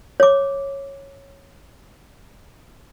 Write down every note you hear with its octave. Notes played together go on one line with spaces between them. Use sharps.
C#5 D6